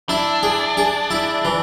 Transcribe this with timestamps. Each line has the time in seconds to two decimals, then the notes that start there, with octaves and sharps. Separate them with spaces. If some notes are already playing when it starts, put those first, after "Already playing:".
0.09 D4 E4
0.43 G#4
0.77 G#4
1.11 E4
1.45 E3